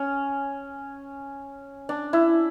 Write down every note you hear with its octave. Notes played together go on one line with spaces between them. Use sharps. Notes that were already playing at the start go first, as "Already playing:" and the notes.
Already playing: C#4
D4
E4